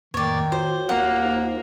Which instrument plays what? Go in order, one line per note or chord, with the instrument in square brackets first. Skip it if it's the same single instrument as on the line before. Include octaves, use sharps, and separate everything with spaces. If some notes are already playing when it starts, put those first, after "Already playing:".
[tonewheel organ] F2 A2 A#3 [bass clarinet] D#3 [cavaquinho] C#5 D5
[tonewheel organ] F4 F#4 C#5 [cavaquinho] C5
[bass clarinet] D#2 [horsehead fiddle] A#3 [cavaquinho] F#5
[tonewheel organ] D#4 F4 C5